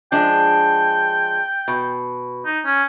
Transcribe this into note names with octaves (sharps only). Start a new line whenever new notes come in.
F3 G#3 D4 G5
B2
D#4
C#4